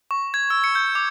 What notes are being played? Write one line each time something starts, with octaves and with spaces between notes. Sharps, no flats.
C#6
G#6
E6
C#7
G6
D6